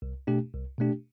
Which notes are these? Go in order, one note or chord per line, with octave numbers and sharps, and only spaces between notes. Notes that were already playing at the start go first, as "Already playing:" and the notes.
C2
B2 A3 D4 G4
C2
B2 A3 D4 G4